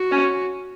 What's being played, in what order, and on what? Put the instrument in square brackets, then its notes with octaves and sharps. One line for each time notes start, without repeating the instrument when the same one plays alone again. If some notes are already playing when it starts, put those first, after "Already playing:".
Already playing: [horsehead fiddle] F#4
[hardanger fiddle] C#4